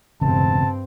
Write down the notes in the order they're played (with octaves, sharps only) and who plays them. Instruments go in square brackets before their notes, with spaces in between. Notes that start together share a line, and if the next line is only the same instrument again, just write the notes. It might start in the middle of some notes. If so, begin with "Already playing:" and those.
[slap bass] E1 [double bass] G2 C4 [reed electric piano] C#3 [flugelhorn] A5